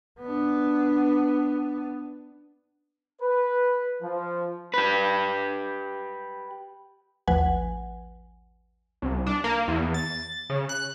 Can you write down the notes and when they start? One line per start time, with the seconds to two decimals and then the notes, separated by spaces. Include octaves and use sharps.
0.20 B3 D4
3.21 B4
4.03 F3
4.74 G4 B4
7.28 A1 D#2 F3 B4 F#5 G#5
9.02 C2
9.27 D4
9.44 A#3
9.68 E2
9.94 A6
10.50 C#3
10.69 F#6